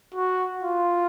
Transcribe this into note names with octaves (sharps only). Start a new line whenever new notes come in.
F#4
F4